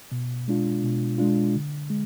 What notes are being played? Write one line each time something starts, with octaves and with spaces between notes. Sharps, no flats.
B2
G#3 D4 F4
B2
G#3 D4 F4
D3
G#3